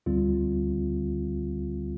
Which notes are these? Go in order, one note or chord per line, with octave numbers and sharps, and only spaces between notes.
D2 D3 G3 C4 F4